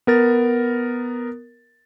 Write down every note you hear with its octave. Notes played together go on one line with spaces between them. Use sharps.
B3 A#4 A6